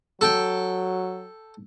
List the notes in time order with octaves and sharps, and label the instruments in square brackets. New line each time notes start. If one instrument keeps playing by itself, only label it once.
[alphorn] F#3 [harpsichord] A4 G5